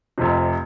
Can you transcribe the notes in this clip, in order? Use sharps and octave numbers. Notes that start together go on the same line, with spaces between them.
F1 F2 C3